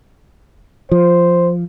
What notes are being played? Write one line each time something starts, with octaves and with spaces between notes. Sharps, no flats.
F3 C5